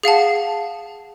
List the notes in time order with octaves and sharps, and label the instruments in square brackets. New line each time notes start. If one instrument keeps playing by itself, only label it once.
[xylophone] G#4 F5 F#5 A5